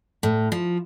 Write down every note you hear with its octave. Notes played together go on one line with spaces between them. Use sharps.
A2
F3